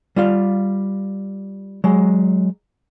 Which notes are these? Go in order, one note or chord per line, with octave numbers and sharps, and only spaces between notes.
G3 F4 F5
F#3 G#3